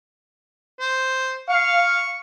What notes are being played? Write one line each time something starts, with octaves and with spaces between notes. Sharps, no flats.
C5
F5 C#6